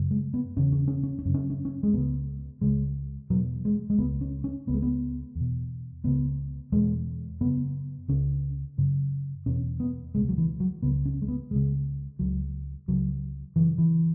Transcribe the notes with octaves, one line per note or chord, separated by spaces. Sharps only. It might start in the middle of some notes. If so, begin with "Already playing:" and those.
Already playing: F#2 C#3
G#3
B3
E2 C#3 C#4
C#4
C#4
C#4
C#4
F#2 C#3
C#4
C#4
C#4
G#3
C#2 C#3 B3
C#2 C#3 G#3
E2 B2 F#3
G#3
G#3
C#2 C#3 B3
C#4
C#4
C#2 C#3 B3
G#3
B3
E2
B2
C#2 C#3 B3
E2 B2 G#3
F#2 C#3 B3
C#2 C#3 C#4
F#2 C#3
E2 B2 C#4
B3
C#2 B2 G#3
F#3
E3
F#3
C#2 C#3 B3
C#4
G#3
B3
C#2 C#3 G#3
C#2 C#3 F#3
C#2 C#3 F#3
F#2 C#3 E3
E3